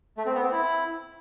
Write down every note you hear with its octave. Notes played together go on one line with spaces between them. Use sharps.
A3
C4
B3
C4
E4